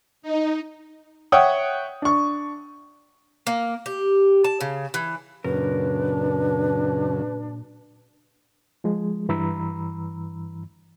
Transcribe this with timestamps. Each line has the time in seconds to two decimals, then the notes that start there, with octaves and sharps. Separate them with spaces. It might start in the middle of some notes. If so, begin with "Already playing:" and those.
0.22 D#4
1.32 C#5 E5 F#5 G5 D#6
2.02 D4 C#6
3.47 A#3
3.86 G4
4.44 A5
4.61 C#3
4.94 E3
5.44 F#2 A#2 C#3 D4 A#4 B4
8.84 F3 G#3
9.29 G2 E3 A#5 B5 E6